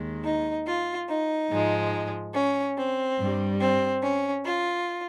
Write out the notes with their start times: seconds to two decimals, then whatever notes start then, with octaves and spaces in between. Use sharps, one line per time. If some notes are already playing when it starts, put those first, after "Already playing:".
Already playing: D#2 D#3 G#3
0.24 D#4
0.66 F4
1.08 D#4
1.50 G#2 F3 G#3
2.34 C#4
2.77 C4
3.18 G2 G3
3.60 C4
4.02 C#4
4.44 F4